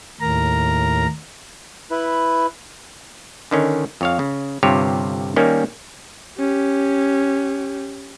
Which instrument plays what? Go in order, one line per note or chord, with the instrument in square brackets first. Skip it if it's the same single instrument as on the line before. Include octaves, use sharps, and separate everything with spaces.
[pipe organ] D#2 A2 A#4 A#5
[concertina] E4 B4
[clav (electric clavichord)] D3 D#3 C#4
F2 C#5 F5
C#3
G1 G2 C3 F4 G4 C#5
D#3 G3 A#3 C#4
[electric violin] C#4 G4